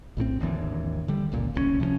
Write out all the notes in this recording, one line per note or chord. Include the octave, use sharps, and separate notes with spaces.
A#1 A2 E3 C4
G#1 D#2 D3 E3
D3 G3
G1 C#2 A#2
D1 C2 B3 C#4
C3 F3 F#3 C#4